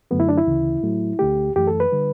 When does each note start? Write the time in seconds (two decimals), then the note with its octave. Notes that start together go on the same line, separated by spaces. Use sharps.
0.11 F#2 D3 F#3 A3 B3
0.20 E4
0.29 D4
0.37 E4
0.47 D2 C#3 E3
0.83 A2 F#3 A3
1.19 D2 D3 A3 G4
1.56 F#2 E3 A3 G4
1.67 A4
1.80 B4
1.92 D3 G3